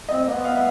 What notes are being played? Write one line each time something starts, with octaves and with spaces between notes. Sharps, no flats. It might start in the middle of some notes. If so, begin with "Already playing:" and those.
C4 D#5
A#3
B3
F5
B3 E5